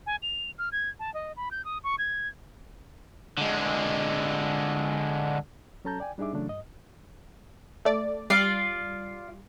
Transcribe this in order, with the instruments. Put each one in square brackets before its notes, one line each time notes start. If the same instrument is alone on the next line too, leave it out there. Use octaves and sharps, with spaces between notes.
[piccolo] G#5
F7
F6
G#6
A5
D#5
B5
G6
D#6
C#6
G#6
[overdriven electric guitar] D3 G#3
[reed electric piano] F#3 C#4 A4 A5 A#5 G6
D5 G5 G#5
G3 D4 D#4 G#4 E5 D6
C#3 E3 F#3 A3 D4
G2 D#5
[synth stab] A3 D5
[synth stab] G3 [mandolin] F4 D5 F5